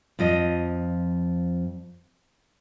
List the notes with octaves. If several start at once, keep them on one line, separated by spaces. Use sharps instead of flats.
F2 F3 D#5